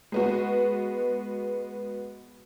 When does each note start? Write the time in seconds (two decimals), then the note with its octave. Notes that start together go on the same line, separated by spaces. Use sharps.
0.12 G#3 B3 F#4